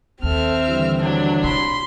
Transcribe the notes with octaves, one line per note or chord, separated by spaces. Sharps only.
D#2 C4 A4 E5 F6
D3 E3 G3
F#3 D4
C3 B5 C6